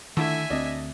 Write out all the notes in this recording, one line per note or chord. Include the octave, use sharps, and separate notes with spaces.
D3 D#3 A3 E4 E5 G#5
D2 C4 D4 D#5